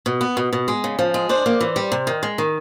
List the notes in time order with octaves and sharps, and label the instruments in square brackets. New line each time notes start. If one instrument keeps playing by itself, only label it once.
[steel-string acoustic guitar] B2
B3
B2
B2
G#3
C#3
F3
G#3
D4 C5 D5
A#3
E3
G3
C3
D#3
G#3
D#3